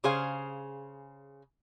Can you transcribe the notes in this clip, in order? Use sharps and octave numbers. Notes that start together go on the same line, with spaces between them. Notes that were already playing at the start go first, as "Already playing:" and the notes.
C#3 G#4 C5 F5